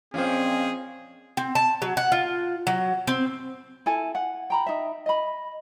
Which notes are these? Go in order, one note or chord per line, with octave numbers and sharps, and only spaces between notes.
F2 A#2 C4 C#4 F4 G#4 C5
C4
A5
F#3
F#5
F4
F#3
C4
E4 A4 G#5
F#5
G5 A#5 B5
D#4 E5
D#5 B5